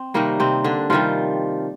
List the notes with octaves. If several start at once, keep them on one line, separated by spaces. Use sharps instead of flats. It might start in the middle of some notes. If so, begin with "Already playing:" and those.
Already playing: C4
C3 D#3 G3 A#3
C3 C4
D3 D4
C3 D#3 F3 G3 F4